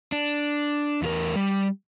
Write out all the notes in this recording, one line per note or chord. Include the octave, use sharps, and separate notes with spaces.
D4
E2 F4 A#4
G3